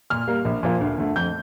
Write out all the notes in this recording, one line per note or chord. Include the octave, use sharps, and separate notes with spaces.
A#2 F6
G3 A#3
A#1
A#2 F3 A#3
D2
D3 A3
F2 G6